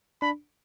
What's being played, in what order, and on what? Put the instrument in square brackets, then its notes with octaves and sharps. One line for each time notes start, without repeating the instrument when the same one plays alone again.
[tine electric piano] D4 [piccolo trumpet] B5